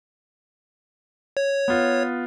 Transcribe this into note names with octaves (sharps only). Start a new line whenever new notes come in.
C#5
B3 F4